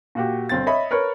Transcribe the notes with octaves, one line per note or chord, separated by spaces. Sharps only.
A#2 F#4 G4
G1 C4 A6
C#5 D#5 E5 B5
A#4 B4 C#5 C#6